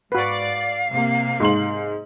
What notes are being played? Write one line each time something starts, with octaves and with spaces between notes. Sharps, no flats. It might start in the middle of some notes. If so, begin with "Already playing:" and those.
G#2 F#4 B4 D5 F5
C3 A#3
G#2 C6 F#7